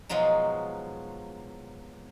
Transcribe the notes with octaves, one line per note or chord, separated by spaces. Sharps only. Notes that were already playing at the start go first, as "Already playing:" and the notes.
B2 F3 F#3 G#3 D#4